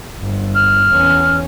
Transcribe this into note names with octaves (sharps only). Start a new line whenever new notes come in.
G1
F6
E2 C#4